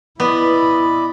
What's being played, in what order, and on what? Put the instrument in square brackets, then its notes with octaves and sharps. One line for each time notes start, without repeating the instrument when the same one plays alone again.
[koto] B3 [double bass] E4 [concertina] D5 D#5 B5